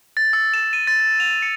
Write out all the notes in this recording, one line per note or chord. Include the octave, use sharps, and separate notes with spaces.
A6
E6
E7
D#7
A6
A6
F7
C#7